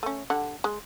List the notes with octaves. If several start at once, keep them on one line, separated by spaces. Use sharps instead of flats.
A3 C#4
D3 G4 F#5
G#3